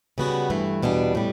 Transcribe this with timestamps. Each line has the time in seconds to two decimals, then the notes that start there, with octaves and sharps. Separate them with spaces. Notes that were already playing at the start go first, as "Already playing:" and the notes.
0.18 C#3 G3 B3 F#4
0.50 G2 E3 A3
0.82 E2 B2 G3 D4
1.15 A2 G3